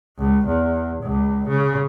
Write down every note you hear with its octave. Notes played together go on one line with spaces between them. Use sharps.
C#2
E2
C#2
C#3